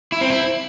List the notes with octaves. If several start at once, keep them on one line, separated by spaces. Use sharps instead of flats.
E4
C4
E4